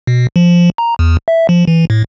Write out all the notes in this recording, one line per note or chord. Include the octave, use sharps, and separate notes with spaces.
B2
F3
A#5
E2
E5
F3
E3
A2